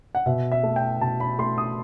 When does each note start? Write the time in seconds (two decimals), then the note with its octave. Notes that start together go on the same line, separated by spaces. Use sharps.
0.15 F#5
0.26 B2 E5
0.52 E5
0.63 A3
0.76 G5
1.01 B2 A5
1.20 B5
1.39 A3 C6
1.58 D#6